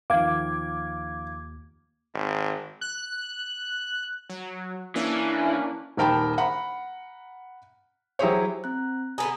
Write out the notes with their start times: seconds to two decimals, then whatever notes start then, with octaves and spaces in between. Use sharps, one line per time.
0.10 D#2 D#3 F3 F5 D6 G#6
2.14 G#1
2.81 F#6
4.29 F#3
4.95 E3 A#3 C#4 D4
5.97 D#1 D#3 A#4 G5 A5 B5
6.38 F#5 A#5 B5
8.19 F#3 E4 G4 G#4 C5 C#5
8.64 C4 A#5 F#6
9.18 D3 B3 G#4 G#5 A#5